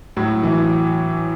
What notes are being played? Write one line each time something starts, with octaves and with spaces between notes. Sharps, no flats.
A2 F#3
E3